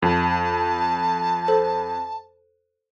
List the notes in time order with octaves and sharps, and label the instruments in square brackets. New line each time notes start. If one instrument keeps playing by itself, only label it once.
[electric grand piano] F2 [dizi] A5
[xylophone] A4 C5